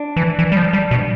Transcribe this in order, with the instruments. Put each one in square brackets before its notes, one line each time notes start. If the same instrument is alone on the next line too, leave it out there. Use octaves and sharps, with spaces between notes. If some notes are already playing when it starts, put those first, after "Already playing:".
Already playing: [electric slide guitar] D4
[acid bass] E3
E3
G3
F3
G3
B2